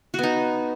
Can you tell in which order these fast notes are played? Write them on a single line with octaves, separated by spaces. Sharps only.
F#4 B3 D#4